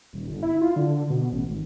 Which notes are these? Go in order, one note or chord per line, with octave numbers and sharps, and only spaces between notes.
D#1
G1
E4
F4
D3
B2
A1
G#1